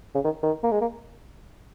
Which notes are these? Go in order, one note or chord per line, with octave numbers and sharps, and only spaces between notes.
C#3
D#3
D#3
A#3
G#3
A#3